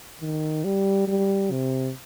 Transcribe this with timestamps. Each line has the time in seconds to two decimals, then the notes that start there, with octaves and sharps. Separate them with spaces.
0.21 D#3
0.64 G3
1.08 G3
1.51 C3